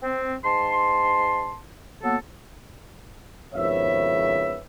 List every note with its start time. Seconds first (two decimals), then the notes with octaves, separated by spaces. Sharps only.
0.03 C4
0.44 G#2 A5 C6
2.04 F#3 A#3 B3 A4
3.54 G#1 F2 C#3 B3 C#5 E5